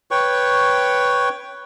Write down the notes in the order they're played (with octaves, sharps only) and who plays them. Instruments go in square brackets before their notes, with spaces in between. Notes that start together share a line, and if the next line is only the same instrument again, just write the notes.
[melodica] B4 C#5 G5 C#6